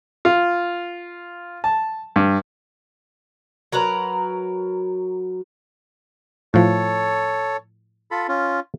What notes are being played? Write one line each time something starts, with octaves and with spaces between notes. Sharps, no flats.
F4
A5
G2
F#3 A#4 B4 A#5
A2 F3 A4 C#5
F4 A4 B5
C#4 F4